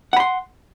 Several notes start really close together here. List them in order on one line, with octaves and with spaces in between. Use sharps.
F#5 B5 C6